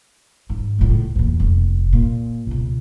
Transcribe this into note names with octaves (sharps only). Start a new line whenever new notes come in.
G#2
C#2 A2
E2 A#2
F1
A#2
C#2 B2